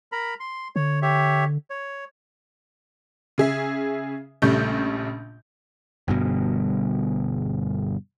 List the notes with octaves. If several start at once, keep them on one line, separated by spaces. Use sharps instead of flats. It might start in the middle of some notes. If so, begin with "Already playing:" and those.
A#4 A#5 B5
C6
D3 C#5
G4 C#5 E5
C#5
C#3 G#4 E5
A#1 C#3 G3 A3 G6
G1 G2 B2